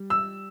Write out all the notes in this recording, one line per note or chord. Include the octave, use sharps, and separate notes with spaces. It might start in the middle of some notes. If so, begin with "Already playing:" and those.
Already playing: G3
E6